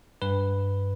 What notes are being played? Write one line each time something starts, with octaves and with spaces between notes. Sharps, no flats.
G2 B4